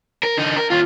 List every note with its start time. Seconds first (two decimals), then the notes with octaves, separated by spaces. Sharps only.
0.23 A#4
0.37 D3 D#4
0.57 A#4
0.70 D#2 F4